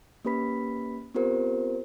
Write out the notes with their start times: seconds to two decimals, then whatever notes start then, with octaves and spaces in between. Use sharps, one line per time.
0.25 A#3 C#4 G4 B4 B5 B6
1.15 B3 C4 F4 G4 A#4 C5